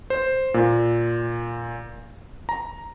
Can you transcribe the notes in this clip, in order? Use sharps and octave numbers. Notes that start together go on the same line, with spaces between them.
C5
A#2
A#5